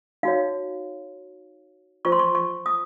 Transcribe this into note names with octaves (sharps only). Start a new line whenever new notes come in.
D#4 F#4 C#5 F5
F4 C5 C#6
C6
C#6
C#6
D#6